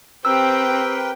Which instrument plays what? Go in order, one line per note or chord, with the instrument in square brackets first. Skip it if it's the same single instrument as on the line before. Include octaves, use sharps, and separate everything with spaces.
[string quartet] C4 [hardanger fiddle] G4 G5 [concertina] A#4 B4 [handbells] E6